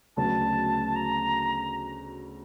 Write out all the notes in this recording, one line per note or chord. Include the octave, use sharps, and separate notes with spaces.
D2 C#3 F#3 B3 A5
A#5